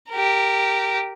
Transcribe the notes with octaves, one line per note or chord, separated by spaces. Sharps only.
G4 A#4